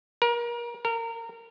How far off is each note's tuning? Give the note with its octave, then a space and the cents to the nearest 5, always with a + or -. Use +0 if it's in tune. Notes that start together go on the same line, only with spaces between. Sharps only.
A#4 +30
A#4 -25